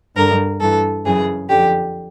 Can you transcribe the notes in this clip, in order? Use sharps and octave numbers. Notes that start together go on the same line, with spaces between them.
G2 D3 A#4
G2 E3 A4
F#2 C#3 E3 G#4
F2 D3 G4